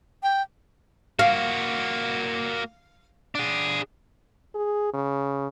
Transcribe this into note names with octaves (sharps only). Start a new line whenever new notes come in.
G5
A#3 F#4 F5
D4 G#4
G#4
C#3